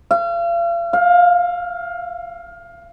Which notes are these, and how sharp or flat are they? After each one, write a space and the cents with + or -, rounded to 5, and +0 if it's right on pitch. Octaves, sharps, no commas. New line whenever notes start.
F5 -40
F5 +20